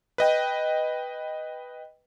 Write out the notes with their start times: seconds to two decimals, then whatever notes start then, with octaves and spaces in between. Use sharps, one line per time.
0.18 B4 D#5 G5